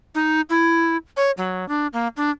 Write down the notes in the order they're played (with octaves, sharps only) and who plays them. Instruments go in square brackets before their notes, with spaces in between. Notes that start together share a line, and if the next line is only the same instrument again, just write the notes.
[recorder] D#4
E4
C#5
F#3
D4
A#3
D4